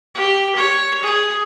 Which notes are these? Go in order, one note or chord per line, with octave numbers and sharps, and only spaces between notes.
G4
C#5
G#4